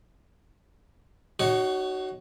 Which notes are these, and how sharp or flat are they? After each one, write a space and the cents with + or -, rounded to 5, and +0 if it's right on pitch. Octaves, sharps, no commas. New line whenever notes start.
D#4 -25 F#4 +20 C#5 +5